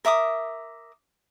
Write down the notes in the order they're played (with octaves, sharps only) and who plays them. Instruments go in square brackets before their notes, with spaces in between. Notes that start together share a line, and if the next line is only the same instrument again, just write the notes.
[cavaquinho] A#4 E5 D6 D#6